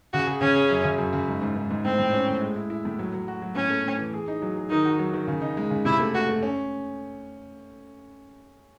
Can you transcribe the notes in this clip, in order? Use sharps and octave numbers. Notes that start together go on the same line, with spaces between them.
C#3 F#4
G#4
C#3 C#4
G#4
F#2
C#3
F#2
C#3
G#2
G#2
G#2
G#2
A2 C4
A2
C#4
A2
G#3
E4
E4
A2
F#3
F#3
F#4
F#3
A2 C#4
A3
A2
E3
G#4
D#4
F#3
G#4
D#3 D#4
F#4
F#3
D#3
C#3
D#4
G#3
C#3
C3 E4
A3
A3 F#4
A3
C#4